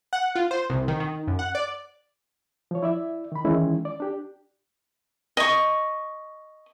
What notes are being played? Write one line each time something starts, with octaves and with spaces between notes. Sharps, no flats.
F#5
F4
C5
C2
D#3
D#3
F#2
F#5
D5
F3 C#5
E4 D5 E5
D#3 B5
D#3 E3 G#3 C#4 E4
D5
D4 G4
D#5 C#6